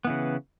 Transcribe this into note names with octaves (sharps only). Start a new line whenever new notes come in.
C#3 E3 B3